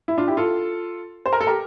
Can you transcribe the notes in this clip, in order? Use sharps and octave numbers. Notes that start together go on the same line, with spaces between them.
E4
D4 F4
E4 G4
F4 A4
C5
A#4
A4
G4 A#4